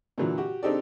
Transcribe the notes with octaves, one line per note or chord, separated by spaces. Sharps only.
A#2 D3 E3 F#3
F#4 G4
C4 D4 D#4 G4 A4 D5